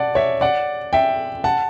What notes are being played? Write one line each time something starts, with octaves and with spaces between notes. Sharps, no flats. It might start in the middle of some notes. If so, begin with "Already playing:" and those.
Already playing: D5 F#5 A5
C#5 E5
D5 F#5
E5 G5
F#5 A5